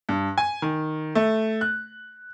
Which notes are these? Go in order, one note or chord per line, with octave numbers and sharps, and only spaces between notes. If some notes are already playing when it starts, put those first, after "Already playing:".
G2
G#5
D#3
A3
F#6